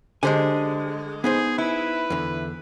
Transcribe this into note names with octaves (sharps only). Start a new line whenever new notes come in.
D3 G#3 G4 C5 G#5
B3 D#4 G#4 C5
E4 B4
E2 D3